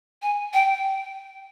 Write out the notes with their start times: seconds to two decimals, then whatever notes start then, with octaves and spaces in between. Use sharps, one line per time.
0.22 G#5
0.54 G5